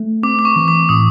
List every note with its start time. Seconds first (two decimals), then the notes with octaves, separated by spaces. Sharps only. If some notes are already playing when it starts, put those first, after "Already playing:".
Already playing: A3
0.23 C4 D6
0.39 D6
0.45 C#6
0.56 E3
0.68 D6
0.89 A2 D#6